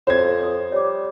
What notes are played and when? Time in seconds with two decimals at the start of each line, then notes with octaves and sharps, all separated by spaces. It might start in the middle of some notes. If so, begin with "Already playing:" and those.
0.07 F2 C5 C#5 G#6
0.43 E4 D#6
0.72 G3 C#5 D6